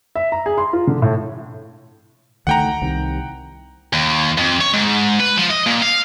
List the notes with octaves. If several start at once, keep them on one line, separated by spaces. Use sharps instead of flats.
E5
A#5
G#4
C6
F4
D3
A2
D2 D#3 A3 F#5 G5 A#5
C2 C3 D#3
D#2
F2
C#5
G#2
B4
F3
D#5
A#2
F5